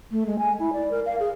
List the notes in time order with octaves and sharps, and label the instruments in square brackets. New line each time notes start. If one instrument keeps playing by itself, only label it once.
[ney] A3
G#3
G#5
E4
D5
A#4
F5
G#4